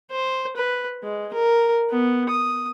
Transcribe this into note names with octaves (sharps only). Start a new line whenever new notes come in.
C5
B4
G#3
A#4
B3
D#6